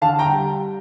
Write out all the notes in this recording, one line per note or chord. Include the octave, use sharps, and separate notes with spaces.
D3 F5 A5
G5 A#5
G3